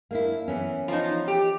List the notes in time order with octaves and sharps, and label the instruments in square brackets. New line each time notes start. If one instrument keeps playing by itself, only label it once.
[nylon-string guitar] A#3 D4 E4
E3 B3 C#4
[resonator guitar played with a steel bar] F3 D#4
G4